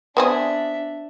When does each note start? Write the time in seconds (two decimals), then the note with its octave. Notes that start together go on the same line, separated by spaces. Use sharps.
0.17 B3 C4 D4 G#4 E5